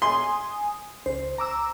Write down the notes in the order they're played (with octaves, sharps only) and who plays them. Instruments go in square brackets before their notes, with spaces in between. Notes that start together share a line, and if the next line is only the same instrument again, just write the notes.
[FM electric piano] G#5 D#6 [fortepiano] C6
[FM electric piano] C#2 C5
A#5 D6 E6